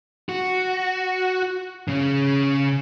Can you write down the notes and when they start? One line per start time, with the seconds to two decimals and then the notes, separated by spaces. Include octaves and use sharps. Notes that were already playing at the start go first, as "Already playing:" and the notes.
0.29 F#4
1.88 C#3 C#4